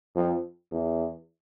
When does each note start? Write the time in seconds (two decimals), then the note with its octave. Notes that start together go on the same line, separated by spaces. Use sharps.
0.15 F2
0.71 E2